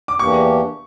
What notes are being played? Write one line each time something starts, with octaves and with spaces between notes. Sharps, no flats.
D6
E2 E3 A#3 D4 G4 C#6